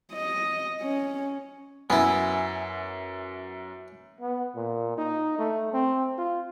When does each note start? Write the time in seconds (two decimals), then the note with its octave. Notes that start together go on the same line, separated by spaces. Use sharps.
0.14 D#5
0.82 C#4
1.90 F#2 B3 E4 G#5
4.21 B3
4.56 A#2
4.98 D#4
5.39 A3
5.73 C4
6.18 F4